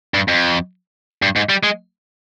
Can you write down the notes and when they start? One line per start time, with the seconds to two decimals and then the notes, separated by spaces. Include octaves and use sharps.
0.14 G2
0.28 F2
1.22 G2
1.36 G#2
1.49 G3
1.63 G#3